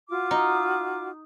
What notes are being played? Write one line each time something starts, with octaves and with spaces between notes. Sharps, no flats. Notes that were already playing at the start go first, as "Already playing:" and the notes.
F4 F#4 D6
D#4